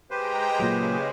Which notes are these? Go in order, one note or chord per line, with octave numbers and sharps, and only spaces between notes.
G#3 G4 B4 C5 G5 A#5
A#2 C#3 F#3 G#3